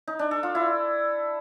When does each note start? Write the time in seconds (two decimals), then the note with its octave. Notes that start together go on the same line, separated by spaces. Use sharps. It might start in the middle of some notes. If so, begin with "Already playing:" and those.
0.08 D#4
0.19 D4
0.31 A4
0.43 F4
0.55 E4